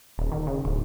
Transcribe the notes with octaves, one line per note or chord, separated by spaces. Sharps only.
D#1
D#3
C#3
D1